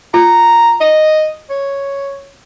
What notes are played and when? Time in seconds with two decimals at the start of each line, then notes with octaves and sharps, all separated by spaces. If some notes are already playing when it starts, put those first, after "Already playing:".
0.14 F4 A#5
0.81 D#5
1.50 C#5